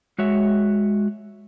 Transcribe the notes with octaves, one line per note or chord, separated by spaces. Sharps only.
G#3 F#4 C#5 E5